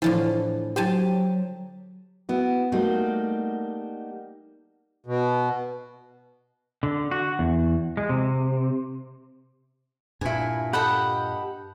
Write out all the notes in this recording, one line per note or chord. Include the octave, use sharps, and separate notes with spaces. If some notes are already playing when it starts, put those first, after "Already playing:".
A2 D3 E3 F3
F#3 G4 C5 G#5 A5
B3 E4 F#4
G3 A3 A#3 D#4 F#4 G4
B2
D3
F#4
E2
G#3
C3
G2 A#2 E4 G#5
G4 A4 D#5 F#5 B5